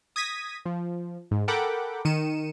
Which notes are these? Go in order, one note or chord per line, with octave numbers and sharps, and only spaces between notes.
D#6 G#6 A#6 B6 D#7
F3
G#2
A4 A#4 F#5 G5 B5 D6
D#3 C#7 D#7 E7